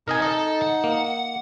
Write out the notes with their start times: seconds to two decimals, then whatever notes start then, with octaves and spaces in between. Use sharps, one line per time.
0.08 C3 D#4 A#4 D#5 G#5
0.22 A4 D#5
0.62 F#5
0.84 A#3